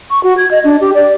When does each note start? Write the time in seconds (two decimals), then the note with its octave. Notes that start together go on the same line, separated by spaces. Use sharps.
0.10 C#6
0.23 F#4
0.37 G#6
0.51 D#5
0.64 D4
0.81 G4
0.94 D5